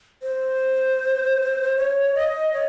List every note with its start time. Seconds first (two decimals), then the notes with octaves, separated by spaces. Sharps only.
0.23 C5
1.77 C#5
2.15 D#5
2.53 C#5